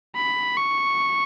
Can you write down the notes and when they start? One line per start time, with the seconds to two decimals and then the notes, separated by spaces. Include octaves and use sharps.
0.16 B5
0.58 C#6